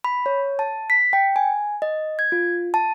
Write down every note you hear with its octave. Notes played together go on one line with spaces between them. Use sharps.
B5
C#5
A5
B6
G5
G#5
D#5
G#6
F4
A5